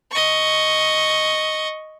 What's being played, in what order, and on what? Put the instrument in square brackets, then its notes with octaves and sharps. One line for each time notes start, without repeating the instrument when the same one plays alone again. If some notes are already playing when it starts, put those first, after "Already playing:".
[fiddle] D#5 C#6